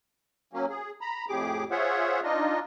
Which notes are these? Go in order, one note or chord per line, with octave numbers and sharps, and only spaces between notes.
F#3 A#3 C#4
G#4
A#5 B5
F2 A2 G4 G#4 D6
F4 G#4 C5 C#5 E5 F#5
D4 D#4 F4 D#5